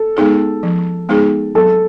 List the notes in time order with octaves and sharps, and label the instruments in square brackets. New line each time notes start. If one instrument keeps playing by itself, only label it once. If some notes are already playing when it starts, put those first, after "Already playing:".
Already playing: [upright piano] A4
[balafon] G#3 B3 D#4 G#4
F3
G#3 B3 D#4 G#4
[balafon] F#3 [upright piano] A4